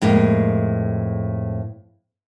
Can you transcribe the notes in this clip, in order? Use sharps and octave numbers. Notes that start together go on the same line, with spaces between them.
F2 A2 G#3 A#3